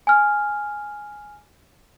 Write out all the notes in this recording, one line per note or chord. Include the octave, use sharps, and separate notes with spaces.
G#5 F6